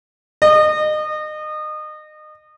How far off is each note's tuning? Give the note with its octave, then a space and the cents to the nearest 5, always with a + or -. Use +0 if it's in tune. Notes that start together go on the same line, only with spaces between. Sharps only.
D#5 -30